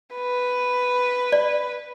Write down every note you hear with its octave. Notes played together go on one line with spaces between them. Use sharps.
B4
D5